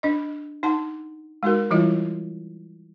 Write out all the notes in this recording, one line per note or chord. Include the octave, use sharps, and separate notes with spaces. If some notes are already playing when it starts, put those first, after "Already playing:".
D4 D#5
D#4 F#5 A5
G#3 D#4 F#4 A#4
E3 G3 E4 F4 D#5